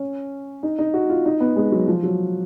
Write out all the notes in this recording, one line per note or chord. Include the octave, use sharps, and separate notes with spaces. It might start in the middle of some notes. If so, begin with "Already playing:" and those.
Already playing: C#4
D#4
D#4
F#4
F4
D#4
B3
G#3
F#3
F3
F#3